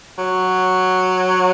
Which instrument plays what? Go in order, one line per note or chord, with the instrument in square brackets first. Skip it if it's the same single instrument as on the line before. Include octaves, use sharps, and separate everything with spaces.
[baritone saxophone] F#3